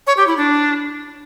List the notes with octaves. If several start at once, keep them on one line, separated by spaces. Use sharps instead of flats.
C#5
G4
E4
D4